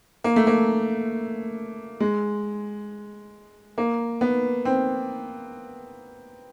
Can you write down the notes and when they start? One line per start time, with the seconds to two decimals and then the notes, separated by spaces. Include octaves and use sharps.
0.24 A#3
0.36 A3
0.47 A#3
2.01 G#3
3.78 A#3
4.21 B3
4.65 C4